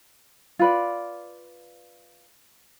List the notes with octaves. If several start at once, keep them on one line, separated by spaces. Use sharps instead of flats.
F4 B4 D5